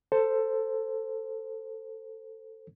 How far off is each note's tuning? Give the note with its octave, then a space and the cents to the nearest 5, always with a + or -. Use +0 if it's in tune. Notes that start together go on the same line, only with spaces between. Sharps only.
A4 +10 C5 +0